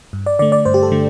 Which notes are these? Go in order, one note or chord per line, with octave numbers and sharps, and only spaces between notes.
G2
D5
D3 A3 D5
D5
G2 C5
G4
A4
D3 A3